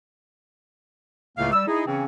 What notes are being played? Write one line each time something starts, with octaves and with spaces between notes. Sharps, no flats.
C#2 A2 C#3 A3 A#3 F5
G3 E6
D#4 E4 G#4
C#3 E3 C4 C#4